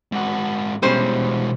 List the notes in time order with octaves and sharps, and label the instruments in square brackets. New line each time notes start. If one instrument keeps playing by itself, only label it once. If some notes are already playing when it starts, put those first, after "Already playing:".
[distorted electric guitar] G#2 F#4
[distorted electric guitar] B2 G#3 [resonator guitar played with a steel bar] G3 C#4 C5